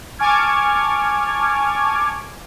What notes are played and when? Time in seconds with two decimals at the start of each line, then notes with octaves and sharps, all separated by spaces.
0.19 G#5 A5 C#6 D6 F6 G#6